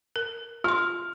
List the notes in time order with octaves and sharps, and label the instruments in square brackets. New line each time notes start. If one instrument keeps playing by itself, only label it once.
[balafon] A#4
[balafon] F4 C6 [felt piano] F6